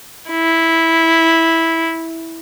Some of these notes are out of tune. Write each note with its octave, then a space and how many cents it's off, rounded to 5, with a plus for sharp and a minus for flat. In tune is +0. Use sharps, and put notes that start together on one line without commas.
E4 -10